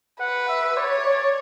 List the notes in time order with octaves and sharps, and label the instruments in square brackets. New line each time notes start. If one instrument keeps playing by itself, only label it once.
[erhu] B4 [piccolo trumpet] F#5
[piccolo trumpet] E5
[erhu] C#5 [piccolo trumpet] D5
[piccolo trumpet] D5